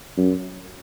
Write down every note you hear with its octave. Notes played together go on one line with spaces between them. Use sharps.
F#2